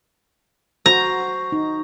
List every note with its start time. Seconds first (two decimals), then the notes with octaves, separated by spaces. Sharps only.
0.86 F#4 C5 A#5
1.52 D#4